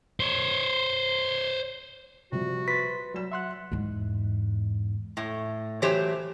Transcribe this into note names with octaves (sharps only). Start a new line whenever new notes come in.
C5 C#5
C3 F3 G3 F#4
B4 C6 A6 B6
F#3 G3 E7
E5 F#5 C6 F#6
E2 G#2
A2
E3 F#3 A3 G4 C5 C#5